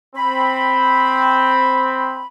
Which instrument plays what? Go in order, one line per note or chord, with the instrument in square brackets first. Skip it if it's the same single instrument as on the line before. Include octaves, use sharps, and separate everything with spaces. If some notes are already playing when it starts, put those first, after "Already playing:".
[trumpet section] C4 [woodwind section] B5